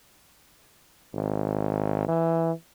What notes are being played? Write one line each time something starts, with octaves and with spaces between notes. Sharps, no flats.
G#1
E3